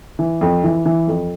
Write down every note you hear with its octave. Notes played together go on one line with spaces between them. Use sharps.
E3
F2
E3
E3
F2